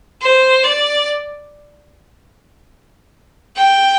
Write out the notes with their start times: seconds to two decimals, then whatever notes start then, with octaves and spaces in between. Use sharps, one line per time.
0.22 C5
0.64 D5
3.56 G5